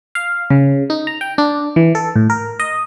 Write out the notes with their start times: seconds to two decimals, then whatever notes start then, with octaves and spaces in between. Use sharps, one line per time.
0.15 F5
0.50 C#3
0.90 D#4
1.07 A#5
1.21 G5
1.38 D4
1.76 E3
1.95 A4
2.16 A2
2.30 A#4
2.60 D#5